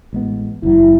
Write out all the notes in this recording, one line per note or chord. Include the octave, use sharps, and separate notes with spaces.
A1 G#3 B3
F#1 E2 F#3 E4